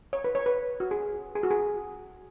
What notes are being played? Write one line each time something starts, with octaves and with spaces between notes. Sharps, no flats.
C#5
B4
C#5
B4
F#4
G#4
G#4
F#4
G#4